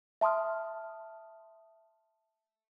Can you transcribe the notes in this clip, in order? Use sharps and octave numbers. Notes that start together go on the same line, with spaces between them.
E5 A5 C6 D#6 F6